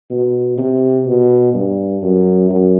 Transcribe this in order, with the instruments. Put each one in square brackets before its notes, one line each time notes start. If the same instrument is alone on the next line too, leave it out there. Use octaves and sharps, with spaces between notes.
[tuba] B2
C3
B2
G2
F#2
F#2